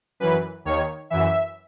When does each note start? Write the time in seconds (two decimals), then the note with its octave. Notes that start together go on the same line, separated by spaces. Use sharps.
0.20 F#2 E3 B4
0.65 D#2 D#3 C#5
1.10 F#2 E3 E5